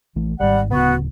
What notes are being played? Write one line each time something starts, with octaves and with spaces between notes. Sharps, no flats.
A#1 E3 A3
G#1 G#2 G3 F#5
D1 A#1 C#3 B3 F#4